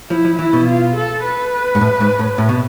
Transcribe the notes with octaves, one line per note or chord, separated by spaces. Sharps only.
F3 E4
F3
E3 E4
B2
F4
A4
B4
G#2
A2
G#2
A2
A2
B2